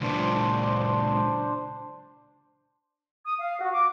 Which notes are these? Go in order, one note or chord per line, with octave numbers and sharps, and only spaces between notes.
C#2 A#2 D4 C5
D#6
F5
F#4
D6